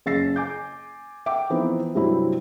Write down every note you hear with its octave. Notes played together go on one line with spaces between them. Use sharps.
F#1 C#3 E6 A6 A#6 C7
G#5 D6 G6
E5 F#5 G5 D6
E3 F3 B3 C4 D#4
G2 C3 F#3 G3 C4 E4